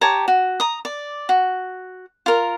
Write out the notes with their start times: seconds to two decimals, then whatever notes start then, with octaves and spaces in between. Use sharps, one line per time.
0.01 G4 C#5 A5 A#5
0.28 F#4
0.60 A#5 D#6
0.85 D5
1.29 F#4
2.26 F4 A#4